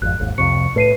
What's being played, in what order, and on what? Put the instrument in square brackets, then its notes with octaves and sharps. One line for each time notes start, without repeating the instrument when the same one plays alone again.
[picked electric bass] G#1 F2 [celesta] F#6
[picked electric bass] G#1 D#2
[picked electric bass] C2 F2 C3 [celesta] C#6 C#7
[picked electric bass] A2 [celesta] B4 C7 D#7